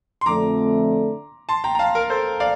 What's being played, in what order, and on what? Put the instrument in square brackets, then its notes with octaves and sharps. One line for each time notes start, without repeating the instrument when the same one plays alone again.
[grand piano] C6
[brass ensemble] F2 D3 A3 [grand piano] A#5 D6
[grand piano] A5 C6
G5 A#5
A#5
F5 A5
A#4
A4 C5
D5 F5